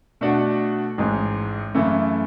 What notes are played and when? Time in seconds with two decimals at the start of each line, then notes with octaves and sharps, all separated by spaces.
0.21 B2 A3 D4 F#4 A4
0.98 A1 G#2 G#3
1.74 F#2 C#3 E3 A3 E4